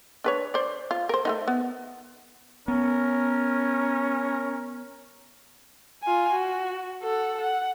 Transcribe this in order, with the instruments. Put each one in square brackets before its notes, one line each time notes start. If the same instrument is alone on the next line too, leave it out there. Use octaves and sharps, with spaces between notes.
[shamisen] D4 B4 C#5
C5 D5
F4
A#4 C5
A3 B3 D#4
B3
[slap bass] B3 [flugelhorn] C#4 [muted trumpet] A#4
[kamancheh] F4 G#5
F#4
A4 F#5
F#5